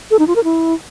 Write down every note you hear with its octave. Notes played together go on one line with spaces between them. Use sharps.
A4
D#4
F4
A#4
E4